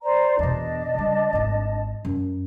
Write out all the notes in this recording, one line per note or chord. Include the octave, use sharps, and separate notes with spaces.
C5 D5 A#5
E2 B2 D4 D#5 A5
C#3 G3
G#1 E4
F#2